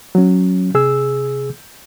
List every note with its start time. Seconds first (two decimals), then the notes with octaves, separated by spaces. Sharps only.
0.15 F#3 C#4
0.74 C3 G#4 E6